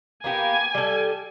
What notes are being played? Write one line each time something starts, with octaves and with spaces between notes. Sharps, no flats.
A#3 B3 G4 G#5
G3 A4